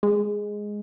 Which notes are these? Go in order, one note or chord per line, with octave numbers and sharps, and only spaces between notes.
G#3